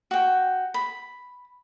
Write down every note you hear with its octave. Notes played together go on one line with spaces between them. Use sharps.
F#4 G5
B5